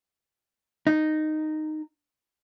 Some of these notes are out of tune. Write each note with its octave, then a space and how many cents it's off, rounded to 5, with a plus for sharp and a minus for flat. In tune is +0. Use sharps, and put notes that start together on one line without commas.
D#4 -10